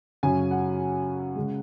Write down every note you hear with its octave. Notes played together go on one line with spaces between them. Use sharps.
F#2 C#3 F#3 G#5
F#5
C#3 G#3